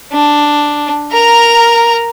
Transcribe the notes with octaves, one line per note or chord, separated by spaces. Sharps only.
D4
A#4 A#5